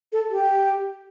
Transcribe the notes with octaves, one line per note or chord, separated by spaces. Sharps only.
A4
G4